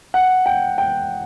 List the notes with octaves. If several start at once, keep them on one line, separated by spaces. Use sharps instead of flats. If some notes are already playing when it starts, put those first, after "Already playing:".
F#5
G5
G5